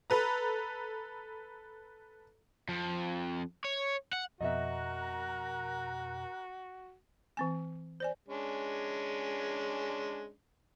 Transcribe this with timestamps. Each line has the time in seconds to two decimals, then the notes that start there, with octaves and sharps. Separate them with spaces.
0.10 A4 B4 A#5
2.69 F2
3.65 C#5
4.13 F#5
4.41 F2 B2 F#4 A#4 D#5 E5 A#5 F#6
7.37 E3 C4 G#5
8.00 C5 D5 G#5
8.28 G#3 C#4 D4